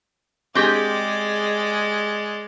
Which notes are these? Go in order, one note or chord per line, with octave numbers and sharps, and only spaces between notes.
G#3 C4 G4 G#4 D5